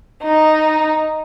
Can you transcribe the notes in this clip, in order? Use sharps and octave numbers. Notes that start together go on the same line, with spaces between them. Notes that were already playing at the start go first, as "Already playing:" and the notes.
D#4